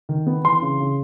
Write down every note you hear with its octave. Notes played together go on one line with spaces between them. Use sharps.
D#3
B3
E3 C6
C#3
C#3